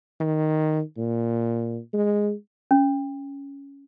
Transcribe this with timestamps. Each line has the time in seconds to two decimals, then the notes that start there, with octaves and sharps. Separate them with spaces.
0.20 D#3
0.97 A#2
1.93 G#3
2.71 C#4